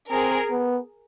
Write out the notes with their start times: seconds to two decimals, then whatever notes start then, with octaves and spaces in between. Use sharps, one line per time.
0.10 C4 G#4 A#4
0.50 B3